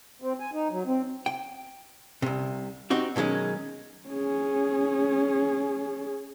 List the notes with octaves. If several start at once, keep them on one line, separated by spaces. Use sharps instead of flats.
C4
G#5
D#4
F#3
C4
G5
C2 C3
C4 D#4 F#4 G4
B2 D#3 F#3 G#3 C#4
C#4 G#4